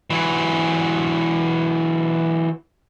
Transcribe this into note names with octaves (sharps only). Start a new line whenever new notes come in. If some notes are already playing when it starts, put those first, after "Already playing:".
E3 F#3